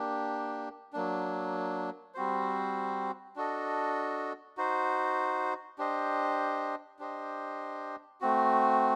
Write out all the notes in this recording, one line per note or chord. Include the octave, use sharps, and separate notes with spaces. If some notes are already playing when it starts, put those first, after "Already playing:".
Already playing: A#3 D4 G4
F#3 A#3 D4
G3 C4 F#4 C5
D4 F#4 A4 D#5
D#4 F#4 C5
D4 G4 C5 D#5
D4 G4 C5 D#5
A3 C4 F#4